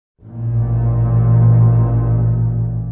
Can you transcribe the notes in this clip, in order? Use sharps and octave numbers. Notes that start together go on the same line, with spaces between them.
A1 A#2